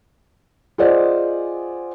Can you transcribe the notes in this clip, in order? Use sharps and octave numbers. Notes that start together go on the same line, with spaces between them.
F4 G#4 C5 D5 D#5 F#5